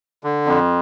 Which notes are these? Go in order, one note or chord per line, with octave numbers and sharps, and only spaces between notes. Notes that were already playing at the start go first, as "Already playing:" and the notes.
D3
F2